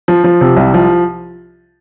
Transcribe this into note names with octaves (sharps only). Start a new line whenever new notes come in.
F3
F3
C3
C2
F3